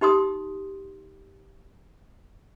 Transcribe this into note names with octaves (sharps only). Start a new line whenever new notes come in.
D#4 G4 C6 D#6